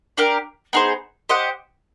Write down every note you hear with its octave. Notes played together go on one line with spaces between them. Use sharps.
D4 G4 A#4
B3 D#4 G#4 C5
G4 C5 D#5 F#5